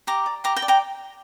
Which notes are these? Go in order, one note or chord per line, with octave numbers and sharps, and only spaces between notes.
G4 A#5 D6
D5
G4 A#5 D6
G5 A#5
D5
G5 A#5